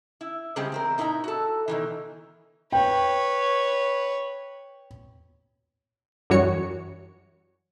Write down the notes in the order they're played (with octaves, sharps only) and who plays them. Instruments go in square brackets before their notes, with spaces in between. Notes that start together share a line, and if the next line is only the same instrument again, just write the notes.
[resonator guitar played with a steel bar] E4
C#3 G3 G#3 C4 G4 G#4
E2 C4 A#4
A#2 D#4 E4 C5 A#5
F#4 A4
B2 D#3 E3
[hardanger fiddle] B4 C#5 [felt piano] G5
[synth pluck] F#2 E3 G3 F#4 C#5 C#7